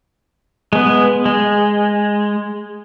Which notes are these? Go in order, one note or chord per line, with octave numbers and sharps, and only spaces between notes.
G#3 B3
G#3